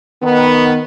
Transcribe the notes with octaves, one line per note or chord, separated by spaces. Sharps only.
D#3 B3